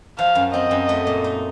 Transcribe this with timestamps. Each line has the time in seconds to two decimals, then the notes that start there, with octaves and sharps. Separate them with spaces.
0.18 F3 F5
0.35 F#2
0.53 C4 D#5
0.71 F#2
0.89 A3
1.07 A#2
1.24 D#4